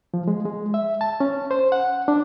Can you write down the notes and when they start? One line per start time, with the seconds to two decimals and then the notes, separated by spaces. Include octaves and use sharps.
0.14 F3
0.28 G#3
0.45 G#3
0.74 E5
1.01 A5
1.20 C#4
1.51 C5
1.72 F#5
2.08 D4